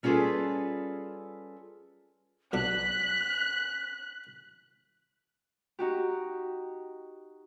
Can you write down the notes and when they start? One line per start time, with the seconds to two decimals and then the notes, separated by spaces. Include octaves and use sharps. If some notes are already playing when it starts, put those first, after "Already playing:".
0.03 G3 C#4 F4 G#4 A4 B4
2.53 B1 D4 F#6 B6
5.79 D#4 F#4 G4